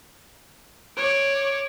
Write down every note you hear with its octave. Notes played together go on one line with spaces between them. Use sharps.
C#5 D5 D7